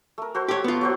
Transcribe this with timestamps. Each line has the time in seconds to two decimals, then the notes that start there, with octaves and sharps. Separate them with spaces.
0.18 A3 A#4
0.34 F#4 A4 C5
0.48 G4 C#5
0.64 B3 F4
0.81 F#3 F#4 C5